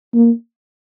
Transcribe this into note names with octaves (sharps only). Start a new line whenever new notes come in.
A#3